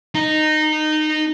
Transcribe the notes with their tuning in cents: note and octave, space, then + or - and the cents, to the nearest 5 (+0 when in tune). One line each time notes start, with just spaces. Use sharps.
D#4 -15